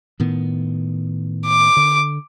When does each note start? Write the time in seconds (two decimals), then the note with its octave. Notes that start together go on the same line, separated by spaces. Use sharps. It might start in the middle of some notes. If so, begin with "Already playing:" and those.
0.20 A2 D#3 B3
1.46 D6
1.77 D3